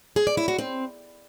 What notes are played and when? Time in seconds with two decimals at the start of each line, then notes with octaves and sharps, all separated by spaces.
0.16 G#4
0.27 D5
0.37 E4
0.48 F#4
0.58 C4